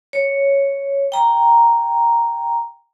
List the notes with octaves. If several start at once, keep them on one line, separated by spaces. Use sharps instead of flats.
C#5
G5 A#5